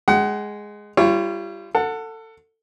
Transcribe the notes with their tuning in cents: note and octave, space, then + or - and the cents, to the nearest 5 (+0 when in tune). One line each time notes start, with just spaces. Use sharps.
G#3 +0 F#5 +30
G3 +0 F4 -40 C#5 +0
A4 +25 F#5 -15